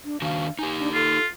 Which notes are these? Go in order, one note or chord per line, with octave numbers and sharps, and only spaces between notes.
D4
D#3 D4 F#4 F5
D#4 G4 G#5
D4
F4 A4